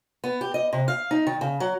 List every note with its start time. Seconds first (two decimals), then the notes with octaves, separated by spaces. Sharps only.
0.24 B3
0.41 G4
0.54 D#5
0.73 C3
0.88 F5
1.11 D#4
1.27 D#3
1.41 C#3
1.60 F#3